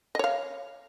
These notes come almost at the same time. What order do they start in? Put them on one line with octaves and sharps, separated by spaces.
D#5 C#5 F5